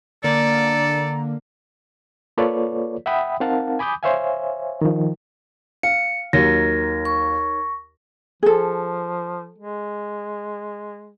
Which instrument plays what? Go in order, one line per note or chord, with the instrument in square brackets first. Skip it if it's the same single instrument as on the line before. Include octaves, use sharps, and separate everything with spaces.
[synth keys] D3 A#3 [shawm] A4 [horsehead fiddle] D5 [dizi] A#5
[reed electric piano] A#3 F4 A4 B4 C#5 D5
E5 F#5 G5 B5 D#6
C4 D#4 A#4 F5 F#5 A5
G#5 B5 D6 D#6 G6
C5 C#5 E5 F5 G#5
D#3 F3
[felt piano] F5 [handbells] C#7
[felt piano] D#2 F#3 [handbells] D#4 A#4 C#5 [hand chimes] A#6
[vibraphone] C#6
[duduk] F3 [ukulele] G#4 A4
[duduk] G#3